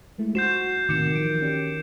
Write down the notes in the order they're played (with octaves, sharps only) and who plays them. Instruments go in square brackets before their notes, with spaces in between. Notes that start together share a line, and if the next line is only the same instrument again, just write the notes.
[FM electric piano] G#3 A3 E4
[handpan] F#4 [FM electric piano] C5 C6 [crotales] G6 C7 E7
[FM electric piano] A2 C3 [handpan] D#3 [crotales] D6 C#7 E7
[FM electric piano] E3 F3 [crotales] D7
[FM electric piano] C#4 G4 D5